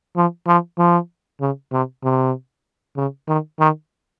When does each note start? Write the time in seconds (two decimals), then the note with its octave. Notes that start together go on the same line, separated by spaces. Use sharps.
0.16 F3
0.47 F3
0.78 F3
1.41 C#3
1.72 C3
2.03 C3
2.96 C#3
3.28 D#3
3.59 D#3